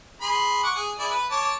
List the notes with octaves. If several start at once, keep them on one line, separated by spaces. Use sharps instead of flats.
G#4 B5 C6
F#5 C#6 D6
G#4
E4 G#4 D5
B4
C#5 A5 D6